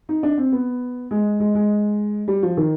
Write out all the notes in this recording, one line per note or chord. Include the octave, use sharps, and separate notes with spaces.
D#4
D4
C4
B3
G#3
G#3
G#3
G3
F3
D#3